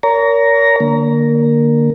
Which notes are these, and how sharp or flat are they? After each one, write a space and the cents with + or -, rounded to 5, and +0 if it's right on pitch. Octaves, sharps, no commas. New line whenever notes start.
A#4 +0 C#5 +40 A#5 +0
D3 +10 A#3 +0